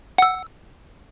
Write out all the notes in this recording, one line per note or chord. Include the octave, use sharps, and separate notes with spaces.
F#5 E6